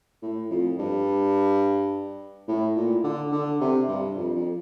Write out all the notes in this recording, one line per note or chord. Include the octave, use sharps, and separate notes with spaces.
A2
F2
G2
A2
A#2
D3
D3
C3
G2
F2
F2